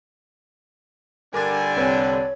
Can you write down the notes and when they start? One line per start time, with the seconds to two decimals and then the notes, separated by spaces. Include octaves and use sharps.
1.34 G2 D3 D4 A#4 G#5 D6 A6
1.76 C2 C4 B4 C#5